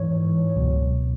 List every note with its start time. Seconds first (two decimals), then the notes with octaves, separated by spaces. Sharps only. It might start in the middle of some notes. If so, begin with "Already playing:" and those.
Already playing: G#2 E3 C#5
0.56 C#2 B2 F#3